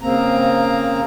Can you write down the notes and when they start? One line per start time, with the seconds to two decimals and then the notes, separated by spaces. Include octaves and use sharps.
0.01 C#3 A#3 C4 A#5